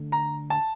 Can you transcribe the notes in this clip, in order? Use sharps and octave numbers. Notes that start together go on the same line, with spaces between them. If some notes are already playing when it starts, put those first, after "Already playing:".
Already playing: D3 A3 D4
A#5
A5